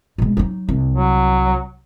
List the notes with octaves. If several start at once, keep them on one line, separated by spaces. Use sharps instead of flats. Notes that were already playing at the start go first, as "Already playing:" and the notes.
B2 G#3
F#3 D#4
C2
F#3